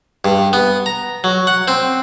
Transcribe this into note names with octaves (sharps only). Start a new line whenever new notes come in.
G2
B3
A#5
F#3
F#5
C4